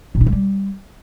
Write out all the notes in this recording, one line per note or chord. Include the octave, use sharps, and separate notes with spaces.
A#2
D#4
A3
G3